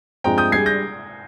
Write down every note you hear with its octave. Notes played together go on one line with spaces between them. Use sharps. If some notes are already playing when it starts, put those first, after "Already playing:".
G2 F3 G#3 C4 G5 A#5
D#6 G6
G3 D4 G#4 G#6 C7
G6 A#6